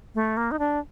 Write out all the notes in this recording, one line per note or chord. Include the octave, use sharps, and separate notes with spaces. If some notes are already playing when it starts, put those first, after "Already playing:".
A3
A#3
D#4
D4